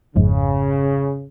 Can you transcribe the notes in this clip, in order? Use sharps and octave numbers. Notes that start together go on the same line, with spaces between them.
G#1 F2 G#2 C#3